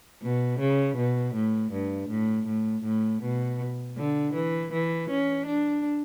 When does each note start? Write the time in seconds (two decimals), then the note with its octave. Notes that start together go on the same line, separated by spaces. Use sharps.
0.22 B2
0.60 C#3
0.97 B2
1.35 A2
1.72 G2
2.10 A2
2.47 A2
2.84 A2
3.22 B2
3.97 D3
4.34 E3
4.72 E3
5.10 C#4
5.47 D4